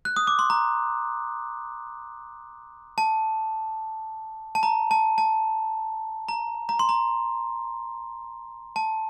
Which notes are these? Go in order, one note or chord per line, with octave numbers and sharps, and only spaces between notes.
F#6
D#6
D6
C6
A#5
A5
A5
A#5
A5
A5
A#5
A#5
C6
A#5
A5